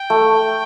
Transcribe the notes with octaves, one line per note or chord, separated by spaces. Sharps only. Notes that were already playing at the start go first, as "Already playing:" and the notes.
Already playing: G5
A3